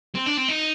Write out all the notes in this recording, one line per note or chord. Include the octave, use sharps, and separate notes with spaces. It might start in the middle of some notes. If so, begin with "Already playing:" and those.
C4
D4
C4
D#4